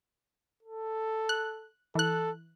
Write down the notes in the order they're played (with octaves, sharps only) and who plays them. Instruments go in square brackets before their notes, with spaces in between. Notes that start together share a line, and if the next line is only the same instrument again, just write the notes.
[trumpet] A4
[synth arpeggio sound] F#6
[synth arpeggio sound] E3 F#6 [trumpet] A4